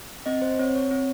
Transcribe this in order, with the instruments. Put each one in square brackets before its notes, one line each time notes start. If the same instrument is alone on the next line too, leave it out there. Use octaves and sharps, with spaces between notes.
[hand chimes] C4 D#5
C5
C4 C#5
C#5
C4